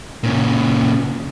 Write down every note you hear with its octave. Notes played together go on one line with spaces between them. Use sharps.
A#2 C#3